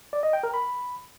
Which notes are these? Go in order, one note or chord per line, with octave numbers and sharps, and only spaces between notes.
D5
D#5
G5
A#4
B5